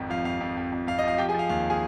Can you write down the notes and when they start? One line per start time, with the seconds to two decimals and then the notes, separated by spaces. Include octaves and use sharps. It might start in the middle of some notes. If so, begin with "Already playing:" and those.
Already playing: G#1 F2
0.10 F3 F5
0.25 F2 F5
0.41 F2
0.57 F2
0.72 F2
0.87 F2 F5
0.99 D#5
1.03 F3 F5
1.18 F3 G4 G5
1.29 G#4 G#5
1.34 F3 F5
1.49 D#2 F5
1.70 G#4 G#5